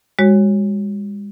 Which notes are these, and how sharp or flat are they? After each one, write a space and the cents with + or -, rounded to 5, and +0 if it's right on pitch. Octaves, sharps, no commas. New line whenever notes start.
G#3 -40 F#4 +0 C#5 -10